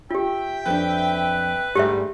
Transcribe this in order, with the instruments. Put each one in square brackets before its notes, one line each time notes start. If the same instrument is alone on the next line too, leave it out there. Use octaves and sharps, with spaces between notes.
[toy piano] F4 G4 [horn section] E5 G5
[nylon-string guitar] F2 D4 [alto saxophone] B4
[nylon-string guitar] G#2 A3 [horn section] D3 G3 G#5 [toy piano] G4 E5